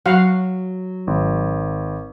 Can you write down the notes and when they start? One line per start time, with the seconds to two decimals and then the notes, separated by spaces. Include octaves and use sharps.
0.06 F#3 F#4 F5 F#5
1.07 G#1